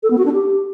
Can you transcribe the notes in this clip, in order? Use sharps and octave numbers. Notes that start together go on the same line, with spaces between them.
A4
B3
F#4
D4
G4